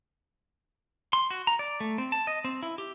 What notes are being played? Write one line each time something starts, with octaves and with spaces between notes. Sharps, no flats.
C6
F#4
A#5
D5
A3
C4
A5
D#5
C4
E4
G4